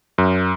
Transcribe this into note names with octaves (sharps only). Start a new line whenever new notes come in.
F#2